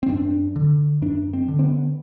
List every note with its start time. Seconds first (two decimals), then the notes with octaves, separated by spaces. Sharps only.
0.03 C4
0.09 F#2 D4
0.56 D3
1.02 F#2 D4
1.33 C4
1.48 D3
1.59 C4
1.64 B3